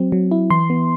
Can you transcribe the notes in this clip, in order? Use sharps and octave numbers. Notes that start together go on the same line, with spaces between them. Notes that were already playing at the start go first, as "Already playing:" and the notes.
Already playing: F#3 C4
F#3
E4
E3 C6
B3